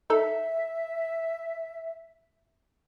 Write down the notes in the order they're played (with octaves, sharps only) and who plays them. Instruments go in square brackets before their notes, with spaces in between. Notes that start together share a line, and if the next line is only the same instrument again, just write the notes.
[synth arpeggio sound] D#4 A4 E6 [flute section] E5